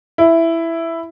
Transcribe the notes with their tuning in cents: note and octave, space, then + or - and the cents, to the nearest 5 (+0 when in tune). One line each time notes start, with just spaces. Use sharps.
E4 +5